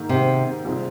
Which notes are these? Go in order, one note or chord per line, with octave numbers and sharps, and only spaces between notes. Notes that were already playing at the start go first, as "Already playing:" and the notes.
Already playing: G#2 D#3 A#3
C3
C2 A#2 G#3 C4